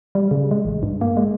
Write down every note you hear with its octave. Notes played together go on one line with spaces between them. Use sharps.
G3
C#3
G#3
A1
G2
A#3
G#3